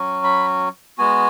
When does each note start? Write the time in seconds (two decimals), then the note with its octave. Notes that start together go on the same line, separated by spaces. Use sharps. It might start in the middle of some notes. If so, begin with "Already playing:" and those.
Already playing: F#3 C#4 F#4
0.24 B5
0.98 G#3 B3 F#4 G#5